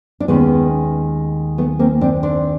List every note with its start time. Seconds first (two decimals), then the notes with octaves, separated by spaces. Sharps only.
0.20 D4
0.28 D#2 D#3 G#3 B3 C#4
1.58 A3 B3
1.79 A#3 C4
2.01 C4 D4
2.23 C4 D4